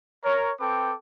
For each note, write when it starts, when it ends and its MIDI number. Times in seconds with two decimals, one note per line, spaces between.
0.25 0.51 70
0.25 0.51 73
0.60 0.94 60
0.60 0.94 69
0.60 0.94 71
0.60 0.94 79
0.60 0.94 86